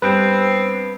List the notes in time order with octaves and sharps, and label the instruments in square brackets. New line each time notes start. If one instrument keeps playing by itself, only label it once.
[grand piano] G2 G3 [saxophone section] B3 C4 [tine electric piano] B4